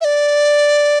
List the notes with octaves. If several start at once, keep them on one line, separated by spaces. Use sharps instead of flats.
E5
D5